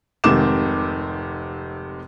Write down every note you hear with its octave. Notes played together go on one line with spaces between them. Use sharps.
F1 G#2 C3 D#3 D6 E7